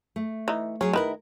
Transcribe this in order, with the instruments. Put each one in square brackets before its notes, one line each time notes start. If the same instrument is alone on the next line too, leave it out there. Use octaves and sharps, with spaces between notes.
[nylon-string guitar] A3
[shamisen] E3 D#4
[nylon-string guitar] F#3 G#4 [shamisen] C#4
[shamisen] D#3 B4 [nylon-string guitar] E4 A#4